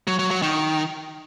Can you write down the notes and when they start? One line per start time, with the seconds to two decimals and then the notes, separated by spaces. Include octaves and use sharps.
0.07 F#3
0.19 F#3
0.31 F#3
0.42 D#3